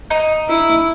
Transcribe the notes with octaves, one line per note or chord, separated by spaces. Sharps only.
D#4
E4